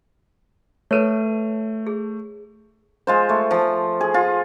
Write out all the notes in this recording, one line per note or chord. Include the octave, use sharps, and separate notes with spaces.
A3 A4 B4 C#5 D#7
G#4
G#3 F4 C5
A3
F3
G#4
F4